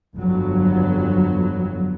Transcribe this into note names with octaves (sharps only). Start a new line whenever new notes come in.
G1 F2 F#3 B3